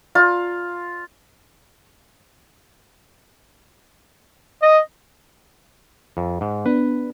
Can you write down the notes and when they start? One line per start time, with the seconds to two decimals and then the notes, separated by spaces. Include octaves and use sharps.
0.15 F4
4.62 D#5
6.17 F2
6.41 G#2
6.66 B3 D4 B4